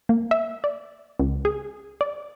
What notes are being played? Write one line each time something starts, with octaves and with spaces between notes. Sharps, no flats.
A#3
E5
D5
C#2
G#4
D5